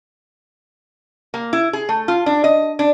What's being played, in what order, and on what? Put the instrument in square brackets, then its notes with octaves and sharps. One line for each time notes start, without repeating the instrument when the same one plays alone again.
[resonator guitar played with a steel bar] A#3
E4
G#4
A3
F4
D4
D#5
D4